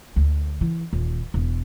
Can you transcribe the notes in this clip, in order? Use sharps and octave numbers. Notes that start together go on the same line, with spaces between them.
D2
E3
D#1
E1